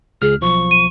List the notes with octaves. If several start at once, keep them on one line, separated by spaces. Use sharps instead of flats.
C#2 G#4 F6
B1 F3 C#6
D#7